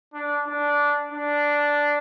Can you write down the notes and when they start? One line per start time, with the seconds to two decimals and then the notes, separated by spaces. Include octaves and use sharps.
0.13 D4
0.47 D4
1.12 D4